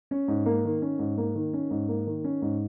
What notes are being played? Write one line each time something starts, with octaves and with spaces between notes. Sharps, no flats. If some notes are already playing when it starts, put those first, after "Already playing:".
C#4
G#2
A#3
D#3
C#4
G#2
A#3
D#3
C#4
G#2
A#3
D#3
C#4
G#2